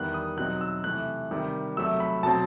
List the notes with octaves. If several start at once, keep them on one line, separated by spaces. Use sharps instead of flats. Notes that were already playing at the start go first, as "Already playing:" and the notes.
Already playing: E2 D#3 G3 B3 F#6
D#6
B2 F#3 C4 D#4 F#6
E6
C3 E3 A3 F#6
C3 D#3 G3
C3 F#3 A3 E6
B5
B2 F#3 C4 A5